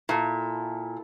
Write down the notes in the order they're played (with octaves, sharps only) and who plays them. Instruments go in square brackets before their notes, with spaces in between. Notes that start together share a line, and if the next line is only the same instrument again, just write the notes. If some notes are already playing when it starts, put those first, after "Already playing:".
[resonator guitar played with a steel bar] A#2 [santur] E4 A4